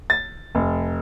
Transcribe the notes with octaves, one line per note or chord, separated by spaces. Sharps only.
A6
F1